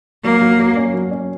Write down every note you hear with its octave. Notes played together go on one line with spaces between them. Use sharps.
F#3 A#3
F#3
F#3
C#4
F#3
C#4